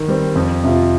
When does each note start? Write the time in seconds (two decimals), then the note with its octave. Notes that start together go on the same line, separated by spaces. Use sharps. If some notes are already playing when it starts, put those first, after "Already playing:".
Already playing: D#3
0.08 G3 C4
0.36 F2
0.64 C3 F3